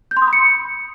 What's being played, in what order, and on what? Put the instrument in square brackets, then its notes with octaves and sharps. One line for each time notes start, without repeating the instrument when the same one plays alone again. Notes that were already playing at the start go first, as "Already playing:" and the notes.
[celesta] G6
C6
D#6
B5
C#7